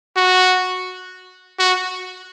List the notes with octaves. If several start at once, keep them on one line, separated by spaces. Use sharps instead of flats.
F#4
F#4